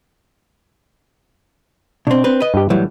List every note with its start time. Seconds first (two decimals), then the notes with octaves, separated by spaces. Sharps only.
2.07 B2 C4 D4
2.24 C4 B4
2.40 B4 D#5
2.54 G2 G4
2.70 A2 E3 F#3 G3